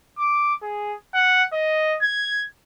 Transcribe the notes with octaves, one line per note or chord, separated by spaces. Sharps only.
D6
G#4
F#5
D#5
G#6